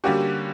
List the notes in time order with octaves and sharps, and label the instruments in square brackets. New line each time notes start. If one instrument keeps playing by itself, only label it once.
[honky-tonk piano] D3 G3 A#3 C#4 F#4 [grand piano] G4